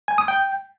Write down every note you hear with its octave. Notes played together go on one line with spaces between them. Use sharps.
G#5
D#6
G5